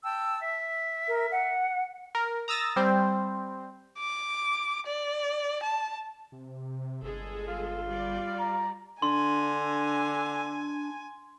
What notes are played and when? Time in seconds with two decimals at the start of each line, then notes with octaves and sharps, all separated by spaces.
0.04 G5 A5 E6
0.41 E5
1.08 A#4
1.32 F#5
2.15 A#4
2.48 A#5 D#6 E6 A6 A#6
2.76 G3 C4 C5
3.99 D6
4.86 D5
5.63 A5
6.32 C3
7.03 G1 G#3 G#4 A4
7.48 F4
7.88 G3 D5
8.39 A#5
9.02 D3 D4 G#5 C6